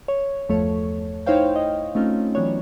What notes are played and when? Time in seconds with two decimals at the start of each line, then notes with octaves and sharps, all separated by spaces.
0.08 C#5
0.48 G1 E2 F3 A3 A4 C#5
1.26 D#4 E4 C5 C#5 F5 G5
1.56 D#5
1.95 A3 C4 C#4 D#4 F4
2.35 E3 F#3 B3 D4 C#5